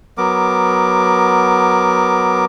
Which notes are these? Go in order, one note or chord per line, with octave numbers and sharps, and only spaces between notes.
F#3 B3 A#4 D6